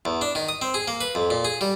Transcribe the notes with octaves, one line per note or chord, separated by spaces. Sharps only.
E2
D4
D#3
D#6
C4
G#4
A#3
B4
F2
A#2
G#4
G3